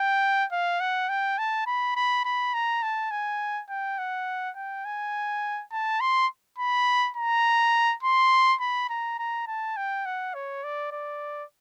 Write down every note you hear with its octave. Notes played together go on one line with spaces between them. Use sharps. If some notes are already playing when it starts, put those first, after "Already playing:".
Already playing: G5
F5
F#5
G5
A5
B5
B5
B5
A#5
A5
G#5
G5
F#5
G5
G#5
A5
C6
B5
A#5
C6
B5
A#5
A#5
A5
G5
F#5
C#5
D5
D5